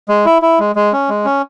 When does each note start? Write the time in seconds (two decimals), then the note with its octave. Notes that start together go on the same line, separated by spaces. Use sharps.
0.08 G#3
0.25 E4
0.42 E4
0.59 G#3
0.76 G#3
0.93 C#4
1.09 G#3
1.25 C#4